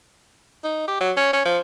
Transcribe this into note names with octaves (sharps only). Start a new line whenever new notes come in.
D#4
G4
F#3
C#4
C#4
F3